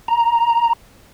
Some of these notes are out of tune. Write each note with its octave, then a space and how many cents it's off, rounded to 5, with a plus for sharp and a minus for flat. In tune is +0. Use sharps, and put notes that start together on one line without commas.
A#5 +5